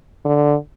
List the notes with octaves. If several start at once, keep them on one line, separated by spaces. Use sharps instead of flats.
D3